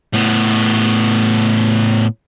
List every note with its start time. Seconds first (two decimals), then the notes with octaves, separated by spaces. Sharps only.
0.13 A2 B3